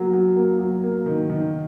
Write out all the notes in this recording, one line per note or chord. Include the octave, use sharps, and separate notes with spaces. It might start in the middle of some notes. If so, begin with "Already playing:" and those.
Already playing: F#3 A#3
F#3
A#3
F#3
A#3
D#3
D#3